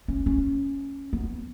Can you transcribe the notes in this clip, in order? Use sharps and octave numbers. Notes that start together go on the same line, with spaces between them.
C#4
C#4
B3